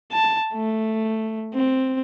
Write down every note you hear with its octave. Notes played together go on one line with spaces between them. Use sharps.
A5
A3
C4